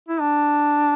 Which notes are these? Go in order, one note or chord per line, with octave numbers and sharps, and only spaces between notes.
E4
D4